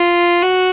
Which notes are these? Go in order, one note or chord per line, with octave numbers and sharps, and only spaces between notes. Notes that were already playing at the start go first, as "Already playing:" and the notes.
Already playing: F4
F#4